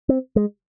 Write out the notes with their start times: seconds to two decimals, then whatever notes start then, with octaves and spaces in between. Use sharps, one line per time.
0.09 C4
0.36 G#3